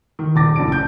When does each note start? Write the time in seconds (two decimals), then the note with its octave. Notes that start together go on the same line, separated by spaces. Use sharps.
0.19 D#3
0.35 D#1 D6 A6 A#6
0.56 F#1 A2 C#4 D4 A5 D7
0.72 G6